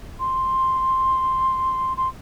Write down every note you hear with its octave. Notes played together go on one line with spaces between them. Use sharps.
C6
C6